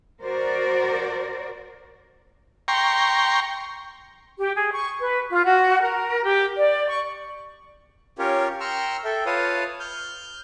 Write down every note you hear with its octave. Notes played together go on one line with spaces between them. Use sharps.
F#4 A#4 C5 D5
G5 A#5 C6 C#6
G4
G#4
C#6
B4
F4
F#4
A#4
G4
D5
C#6
C#4 F4 G4 A#4 C#5
G5 A#5 C6 C#6 E6 F6
A4 E5 G5
F4 B4 C#5 F5 A5 D#6
F6 G6